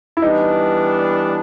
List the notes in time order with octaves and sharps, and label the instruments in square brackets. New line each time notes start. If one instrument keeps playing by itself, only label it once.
[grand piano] E4
[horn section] E3 G3 B3 D4 [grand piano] D#4